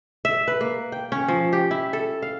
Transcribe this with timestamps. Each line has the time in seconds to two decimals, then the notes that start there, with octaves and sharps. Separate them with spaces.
0.25 E5
0.48 B4
0.61 A#3
0.92 G5
1.12 C#4
1.28 F3
1.53 G4
1.71 E4
1.93 A4
2.22 F5